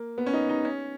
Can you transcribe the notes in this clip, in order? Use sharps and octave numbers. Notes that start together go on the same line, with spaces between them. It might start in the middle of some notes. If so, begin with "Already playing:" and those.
Already playing: A#3
B3
C#4
D#4
D#4
C#4